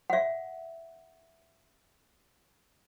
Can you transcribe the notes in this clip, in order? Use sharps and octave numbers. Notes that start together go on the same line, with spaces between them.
E5 F#5